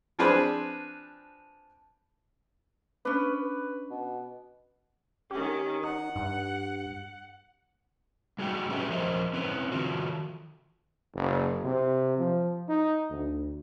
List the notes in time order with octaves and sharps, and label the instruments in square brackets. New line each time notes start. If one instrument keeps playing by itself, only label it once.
[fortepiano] F3 C4 D4 G#4 B4
[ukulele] C#4 D4 [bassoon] B4
[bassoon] B4
B2
[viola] D#3 C#4 [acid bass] G4
[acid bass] D#4 [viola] F#5
[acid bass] G2
[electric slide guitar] G3 G#3 D#4 F#4 G5
G#3 C#4 G4 A4 B4 E5
F3 A#4 C5 D#5
C4 C#4 E4 B4
D#3 F4 F#4 A4
[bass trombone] F#1
C3
F3
D#4
D2